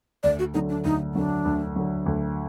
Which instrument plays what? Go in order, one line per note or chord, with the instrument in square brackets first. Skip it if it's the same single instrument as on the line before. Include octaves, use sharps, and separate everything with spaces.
[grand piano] D2 [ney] D5
[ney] F#4
[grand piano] D3 F#3 [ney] D#4
[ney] D4
[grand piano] D2 [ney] D#4
[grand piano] D3 F#3 [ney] D4
[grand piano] D2
D3 F#3
D2